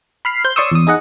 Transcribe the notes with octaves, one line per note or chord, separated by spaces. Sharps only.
B5 F6 C7
C5 G6
C#5 D5 C6 C#6 D#6 E6
E2 D#6
D#4 G#4 D#5 F#5